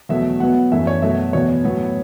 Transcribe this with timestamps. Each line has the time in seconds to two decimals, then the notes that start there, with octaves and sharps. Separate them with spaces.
0.09 E2 B2 F#3 A3 E5
0.40 B2 F#3 B3 F#5
0.72 F#2 E3 A3 E5
0.87 C#5
1.02 B2 F#3 A3 E5
1.33 E2 B2 B3 C#5
1.64 A2 F#3 B3